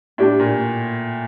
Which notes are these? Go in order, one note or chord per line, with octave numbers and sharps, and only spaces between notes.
A2 D4 G4 D5
A#2